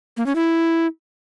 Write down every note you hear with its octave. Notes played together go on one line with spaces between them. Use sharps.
A#3
C#4
E4